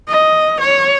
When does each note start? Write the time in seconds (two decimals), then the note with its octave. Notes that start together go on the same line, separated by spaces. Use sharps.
0.09 D#5
0.61 C#5